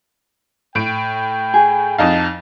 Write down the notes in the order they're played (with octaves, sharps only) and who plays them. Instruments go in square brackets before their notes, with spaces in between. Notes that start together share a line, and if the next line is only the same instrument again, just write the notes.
[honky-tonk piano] A2 D7 [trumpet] G5
[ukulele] G#4
[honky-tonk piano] F2 D#4 F5 [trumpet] A5